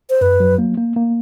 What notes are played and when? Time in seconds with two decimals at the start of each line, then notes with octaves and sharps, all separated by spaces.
0.10 C5
0.21 F#2 B4
0.40 F#3
0.58 A#3
0.77 A#3
0.96 A#3